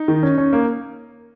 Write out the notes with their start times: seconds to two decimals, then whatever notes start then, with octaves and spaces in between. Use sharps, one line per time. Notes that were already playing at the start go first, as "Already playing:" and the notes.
Already playing: D#4
0.08 D#3
0.23 C#4
0.38 C#4
0.53 A#3